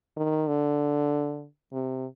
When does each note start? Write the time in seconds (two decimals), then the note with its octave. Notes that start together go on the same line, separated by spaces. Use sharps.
0.17 D#3
0.48 D3
1.73 C3